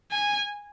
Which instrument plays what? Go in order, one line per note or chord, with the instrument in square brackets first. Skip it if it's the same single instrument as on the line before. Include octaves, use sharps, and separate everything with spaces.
[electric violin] G#5